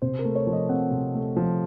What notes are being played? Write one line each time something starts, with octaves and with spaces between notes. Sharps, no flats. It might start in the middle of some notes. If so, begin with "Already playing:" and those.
C3 C5
A#4
A3
C#5
F3
D#5
C4 F#5
C3
A3
F3